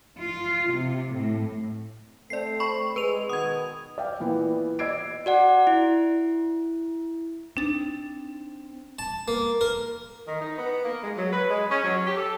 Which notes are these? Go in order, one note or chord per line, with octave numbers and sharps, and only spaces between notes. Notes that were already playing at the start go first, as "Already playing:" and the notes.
F4
C3
A2
A3 C4 D5 C7
B5 C#6
G#3 B4 D#7 F7
B2 D#3 B3 D#6 G#6
D5 E5 F5 G5
A#2 E3 B3
D5 D#5 E6 G#6 C7 D7
F#4 D5 F#5
E4
C4 D4 D#4 A6
A5
A#3
A#4
D#3
D#4
B3
A#3
G#3
F#3
B4
G#3
C#4
F#3
G4
A4